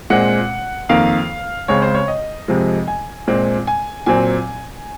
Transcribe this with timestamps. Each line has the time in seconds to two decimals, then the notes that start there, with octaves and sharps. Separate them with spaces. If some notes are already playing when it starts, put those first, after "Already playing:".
0.10 A#2 G#3 C4 F#5
0.89 F2 D#3 A#3 F5
1.68 C#2 C#3 G#3 C4 C#5
1.82 C5
1.94 C#5
2.08 D#5
2.48 F2 C3 F3 G#3
2.88 G#5
3.27 A#2 G#3 C4
3.67 G#5
4.06 A#2 F#3 C4 G#5